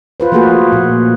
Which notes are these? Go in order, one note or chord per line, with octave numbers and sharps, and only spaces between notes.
F4 B4 C5
F3 A3 A#3 F#4 G#4 B4
A#2